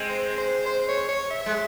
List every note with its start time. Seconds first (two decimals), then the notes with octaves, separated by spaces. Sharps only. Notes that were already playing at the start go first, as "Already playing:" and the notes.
Already playing: G#3 C4
0.09 C5
0.38 C5
0.66 C5
0.88 C#5
1.09 C#5
1.30 E5
1.46 G#3